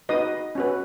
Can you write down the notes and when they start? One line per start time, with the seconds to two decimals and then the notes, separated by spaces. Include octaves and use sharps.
0.09 D#4 F#4 B4 D#5 D#6
0.55 C#4 F#4 B4